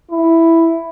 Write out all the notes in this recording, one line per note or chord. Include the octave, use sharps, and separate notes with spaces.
E4